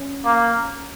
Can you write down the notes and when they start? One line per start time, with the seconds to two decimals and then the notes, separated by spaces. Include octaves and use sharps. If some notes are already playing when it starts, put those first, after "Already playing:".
Already playing: C#4
0.25 A#3